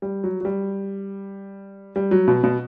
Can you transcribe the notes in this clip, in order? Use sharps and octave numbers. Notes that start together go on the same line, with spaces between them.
G3
F#3
F#3
G3
G3
F#3
B2
B2